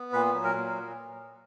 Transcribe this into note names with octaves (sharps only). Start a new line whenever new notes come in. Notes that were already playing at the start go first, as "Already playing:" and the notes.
Already playing: B3
A#2 B4
F#3
A#4
A#2